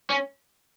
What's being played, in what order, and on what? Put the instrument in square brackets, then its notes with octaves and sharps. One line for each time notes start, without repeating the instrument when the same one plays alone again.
[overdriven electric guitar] C#4